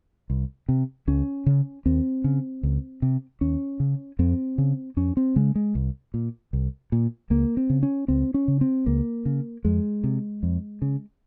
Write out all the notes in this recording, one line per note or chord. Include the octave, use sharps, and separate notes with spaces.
C2
C3
C#2 C#4
C#3
D#2 C4
C#3
C#2
C3
D#2 C#4
C#3
F2 C4
C#3
F2 C#4
C4
C#3 G#3
G#3
C2
A#2
C2
A#2
C#2 A#3
C4
C#3
C#4
C#2 C4
C#4
C#3
C4
C#2 A#3
C#3
F2 G#3
C3
F2
C#3